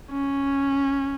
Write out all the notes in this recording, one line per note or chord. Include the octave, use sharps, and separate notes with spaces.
C#4